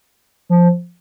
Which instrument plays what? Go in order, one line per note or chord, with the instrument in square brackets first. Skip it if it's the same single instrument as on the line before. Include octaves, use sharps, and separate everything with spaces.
[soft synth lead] F3